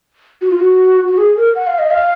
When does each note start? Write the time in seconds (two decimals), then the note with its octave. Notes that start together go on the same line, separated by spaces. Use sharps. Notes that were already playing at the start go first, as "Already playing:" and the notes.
0.42 F#4
0.50 F4
0.58 F#4
1.08 F#4
1.17 G#4
1.37 A#4
1.55 F#5
1.67 F5
1.79 D#5
1.91 F5